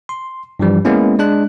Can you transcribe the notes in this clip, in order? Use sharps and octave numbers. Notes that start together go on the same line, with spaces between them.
C6
G2 E3 F3 G3
G#3 A#3 B3 C#4 E4
G#3 D4 F#6